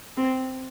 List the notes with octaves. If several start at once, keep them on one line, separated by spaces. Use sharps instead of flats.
C4